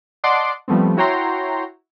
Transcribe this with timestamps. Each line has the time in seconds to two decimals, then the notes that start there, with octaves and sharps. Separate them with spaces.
0.24 D5 D#5 F#5 A5 C6 D6
0.68 F3 G3 A3 B3 C4
0.97 E4 F#4 C#5 G5 A#5 C6